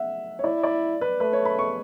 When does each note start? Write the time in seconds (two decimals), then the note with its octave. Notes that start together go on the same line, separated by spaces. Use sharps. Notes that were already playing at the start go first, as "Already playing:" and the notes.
Already playing: E5 F#5
0.39 C#5
0.44 E4 D5
0.63 D5
1.01 B4
1.20 A3 B4
1.33 C#5
1.45 B5
1.59 C#6